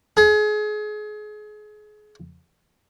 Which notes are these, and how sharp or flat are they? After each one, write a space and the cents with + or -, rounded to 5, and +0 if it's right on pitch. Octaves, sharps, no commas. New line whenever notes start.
G#4 +30